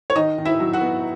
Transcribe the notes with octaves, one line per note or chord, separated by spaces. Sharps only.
C#5
D#3 D#4 D#5
D#3
E4 E5
F#3
F#4 F#5
B3